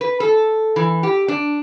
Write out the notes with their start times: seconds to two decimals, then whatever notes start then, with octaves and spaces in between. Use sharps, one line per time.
0.01 B4
0.20 A4
0.76 E3
1.03 G4
1.28 D4